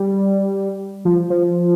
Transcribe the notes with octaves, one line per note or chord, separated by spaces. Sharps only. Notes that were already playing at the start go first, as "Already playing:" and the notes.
Already playing: G3
F3
F3